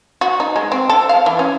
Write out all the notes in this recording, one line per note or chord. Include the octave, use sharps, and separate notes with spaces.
F#4
D#4
G#3
C4
A4
F5
E3
C#4